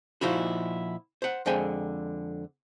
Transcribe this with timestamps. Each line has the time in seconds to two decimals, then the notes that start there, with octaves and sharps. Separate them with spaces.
0.21 A#2 F3 D#4 E4 F#4
1.22 C5 F#5
1.46 F2 D3 G#3 C5 G5 G#5